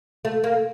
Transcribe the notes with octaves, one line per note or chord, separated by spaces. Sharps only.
A3
A#3